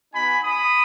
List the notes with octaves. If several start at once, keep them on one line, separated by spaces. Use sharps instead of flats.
B3 D#4 F#4 G#5 B5
B5 D#6